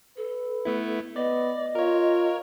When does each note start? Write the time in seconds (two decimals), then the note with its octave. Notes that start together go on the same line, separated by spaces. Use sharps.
0.17 A4 B4
0.65 A3 B3 E4
1.16 B3 D5 D#5
1.75 F4 A#4 C#5